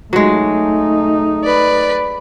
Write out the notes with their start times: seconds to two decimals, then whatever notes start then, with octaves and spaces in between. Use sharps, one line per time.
0.13 F#3 G#3 A3 D#4
1.44 B4 D5